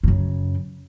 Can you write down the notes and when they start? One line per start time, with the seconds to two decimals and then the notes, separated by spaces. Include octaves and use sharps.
0.03 F#2 C#3